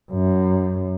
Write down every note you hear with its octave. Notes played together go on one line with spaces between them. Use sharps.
F#2